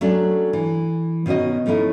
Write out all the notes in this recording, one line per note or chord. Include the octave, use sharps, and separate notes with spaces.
F#3 A3 C#4 D4
E3
B2 D#3 C#4 F#4 D#5
F3 A3 C#4 D#4 E4